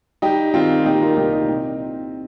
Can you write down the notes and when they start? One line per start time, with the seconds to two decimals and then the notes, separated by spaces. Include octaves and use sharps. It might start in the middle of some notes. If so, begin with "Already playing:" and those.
0.22 G3 D#4 G4
0.54 D#3 C4 F4
0.85 A#2 D#4 G4
1.02 F4 A#4
1.17 C2 D#4 G4
1.33 D#4
1.49 C4